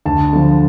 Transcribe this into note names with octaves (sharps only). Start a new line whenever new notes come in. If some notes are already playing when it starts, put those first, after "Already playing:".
D2 A5
D3 F3